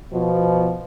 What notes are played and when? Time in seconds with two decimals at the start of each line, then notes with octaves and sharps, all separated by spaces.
0.12 B2 F3